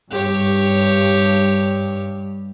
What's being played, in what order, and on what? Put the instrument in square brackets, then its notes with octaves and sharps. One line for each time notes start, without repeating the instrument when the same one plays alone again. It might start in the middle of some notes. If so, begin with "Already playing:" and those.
[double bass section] G2 [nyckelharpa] G4 C#5